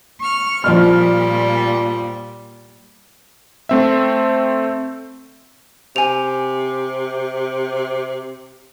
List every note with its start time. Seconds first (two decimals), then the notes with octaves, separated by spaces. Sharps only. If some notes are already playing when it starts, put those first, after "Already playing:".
0.20 C#6 F6
0.64 A#2 F3 G3 D5 F6
3.69 A3 C4 E5
5.96 C3 G#5 F7